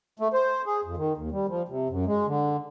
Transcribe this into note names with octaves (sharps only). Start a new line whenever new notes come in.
A3
C5
G#4
F2
D#3
D#2
G3
F3
C3
F#2
G#3
D3